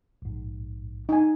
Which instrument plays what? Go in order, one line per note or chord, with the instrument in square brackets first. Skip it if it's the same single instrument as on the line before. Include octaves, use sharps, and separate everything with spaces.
[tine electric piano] A#1 G#2
[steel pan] D#4 G#5